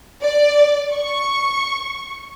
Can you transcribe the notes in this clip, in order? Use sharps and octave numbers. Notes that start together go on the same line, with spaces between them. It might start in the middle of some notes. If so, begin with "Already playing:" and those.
D5
C#6